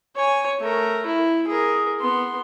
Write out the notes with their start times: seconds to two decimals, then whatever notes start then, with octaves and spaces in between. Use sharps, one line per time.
0.16 C#5 G#5
0.60 A3 A#4
1.06 E4
1.48 G#4 A#4
2.00 B3 C6